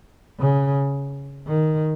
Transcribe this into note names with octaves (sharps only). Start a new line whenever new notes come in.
C#3
D#3